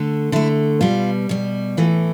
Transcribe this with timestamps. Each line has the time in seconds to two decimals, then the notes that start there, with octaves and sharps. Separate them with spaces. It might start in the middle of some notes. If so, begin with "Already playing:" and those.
Already playing: D3 A3
0.32 D3 A3 E4
0.81 B2 G3 F4
1.29 B2 G3
1.77 A2 E3 A3 F4